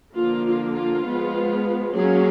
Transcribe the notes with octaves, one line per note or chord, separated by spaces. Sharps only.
D3 F3 A#3 F4
F4
F4
F3 G#3 B3
F#3 A#3 C#4 G#4